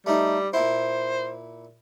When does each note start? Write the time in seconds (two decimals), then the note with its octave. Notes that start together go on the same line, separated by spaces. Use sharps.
0.06 G3 A3 D#4
0.53 A#2 E4 C5